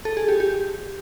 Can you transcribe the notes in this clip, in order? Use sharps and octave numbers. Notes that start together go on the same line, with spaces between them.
A4
G#4
G4
G4